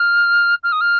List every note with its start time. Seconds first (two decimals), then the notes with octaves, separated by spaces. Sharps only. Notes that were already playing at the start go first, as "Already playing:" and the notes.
Already playing: F6
0.63 F6
0.72 D#6
0.81 F6